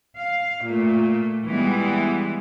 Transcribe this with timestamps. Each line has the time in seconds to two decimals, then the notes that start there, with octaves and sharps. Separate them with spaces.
0.19 F5
0.64 A#2 A3
1.48 E3 G3 G#3 B3